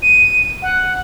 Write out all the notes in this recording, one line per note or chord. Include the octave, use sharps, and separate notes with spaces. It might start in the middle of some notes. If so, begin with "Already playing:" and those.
D#7
F#5